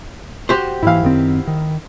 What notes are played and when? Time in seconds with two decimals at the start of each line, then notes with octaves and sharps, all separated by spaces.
0.49 F#4 G4 C5
0.83 G#2 E3 E4 F5
1.03 F#2 D#3 C4
1.47 D#3